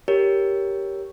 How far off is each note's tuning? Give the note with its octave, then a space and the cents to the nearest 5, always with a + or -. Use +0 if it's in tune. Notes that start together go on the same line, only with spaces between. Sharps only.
G4 +0 A#4 +0 C#5 +0